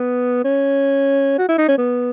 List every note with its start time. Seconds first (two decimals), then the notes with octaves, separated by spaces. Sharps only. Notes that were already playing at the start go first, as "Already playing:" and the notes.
Already playing: B3
0.45 C#4
1.39 F#4
1.49 E4
1.58 D#4
1.68 C#4
1.78 B3